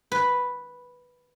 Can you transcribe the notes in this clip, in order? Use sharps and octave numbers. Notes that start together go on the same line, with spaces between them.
B4